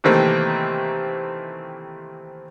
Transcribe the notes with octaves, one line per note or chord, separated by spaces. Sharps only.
C3 D#3 E3 A3 A#3 C4